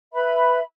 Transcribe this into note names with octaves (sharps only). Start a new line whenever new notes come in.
B4 E5 B5